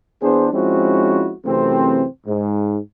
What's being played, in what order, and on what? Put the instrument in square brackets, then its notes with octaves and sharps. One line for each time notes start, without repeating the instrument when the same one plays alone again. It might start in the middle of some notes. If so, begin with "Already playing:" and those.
[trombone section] E2 B3 D4 G#4 C5
F3 G#3 C4 C#4 E4 F#4
F#2 C3 E3 A3 C4
G#2